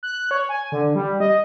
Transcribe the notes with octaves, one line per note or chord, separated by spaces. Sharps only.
F#6
C#5
G#5
D3
G3
D#5